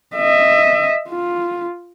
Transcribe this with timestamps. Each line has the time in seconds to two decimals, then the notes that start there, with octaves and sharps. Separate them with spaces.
0.15 D#5 E5
1.10 F4